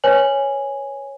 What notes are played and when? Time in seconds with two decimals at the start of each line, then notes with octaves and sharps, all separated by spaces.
0.04 B4 C#5 G#5 F#7